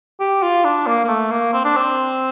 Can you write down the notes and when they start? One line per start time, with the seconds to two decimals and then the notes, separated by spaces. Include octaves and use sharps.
0.20 G4
0.43 F4
0.64 D4
0.87 A#3
1.04 A#3
1.08 A3
1.31 A#3
1.53 C4
1.64 D4
1.77 C4